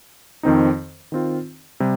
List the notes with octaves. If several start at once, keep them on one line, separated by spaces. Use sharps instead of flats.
F2 D#3 C4 D#4
D#3 C4 F4
C3 G3